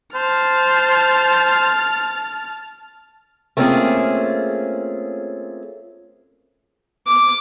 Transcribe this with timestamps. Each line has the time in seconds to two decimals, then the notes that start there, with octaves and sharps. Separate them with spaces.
0.15 C5 A5 F6
3.57 A3 A#3 C4 C#4 F4 G#4
7.07 D6